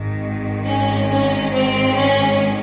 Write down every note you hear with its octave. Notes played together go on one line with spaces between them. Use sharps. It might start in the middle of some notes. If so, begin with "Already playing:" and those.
Already playing: G#1 G#2 D#3
C#4
C#4
C4
C#4